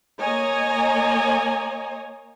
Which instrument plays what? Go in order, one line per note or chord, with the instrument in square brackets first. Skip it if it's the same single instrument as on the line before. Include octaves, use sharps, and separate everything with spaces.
[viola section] A#3 C#5 D#5 G#5 A#5